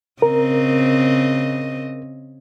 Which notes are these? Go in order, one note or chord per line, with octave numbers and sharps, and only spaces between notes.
C#3 C4 A#4 D#5